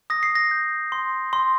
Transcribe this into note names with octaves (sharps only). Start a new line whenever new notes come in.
D#6 A#6
C7
A#6
G6
C6
C6